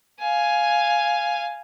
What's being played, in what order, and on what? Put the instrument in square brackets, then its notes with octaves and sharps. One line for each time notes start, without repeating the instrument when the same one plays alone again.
[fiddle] F5 G#5